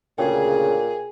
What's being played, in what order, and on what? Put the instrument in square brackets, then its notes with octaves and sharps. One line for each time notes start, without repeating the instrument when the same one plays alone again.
[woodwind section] D2 C#3 [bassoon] A#2 [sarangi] G#4 [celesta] C#5 G5